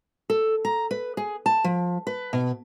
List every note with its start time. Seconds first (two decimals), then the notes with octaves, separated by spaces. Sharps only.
0.30 A4
0.65 A#5
0.91 B4
1.17 G#4
1.46 A5
1.64 F3
2.07 B4
2.33 B2